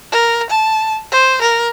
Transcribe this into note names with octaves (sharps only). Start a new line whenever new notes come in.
A#4
A5
C5
A#4